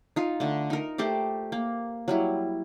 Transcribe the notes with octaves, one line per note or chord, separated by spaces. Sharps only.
D#4 F4
D3 A3
D#4 A#4
A3 G4 C5 D5
A#3
F#3 G3 E4